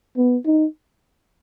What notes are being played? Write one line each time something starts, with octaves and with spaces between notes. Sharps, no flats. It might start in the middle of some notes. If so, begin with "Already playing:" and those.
B3
D#4